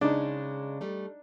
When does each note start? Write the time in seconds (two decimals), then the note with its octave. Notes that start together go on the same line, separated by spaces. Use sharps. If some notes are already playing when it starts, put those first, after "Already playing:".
0.01 C#3 G#3 D4 D#4
0.81 G3 A3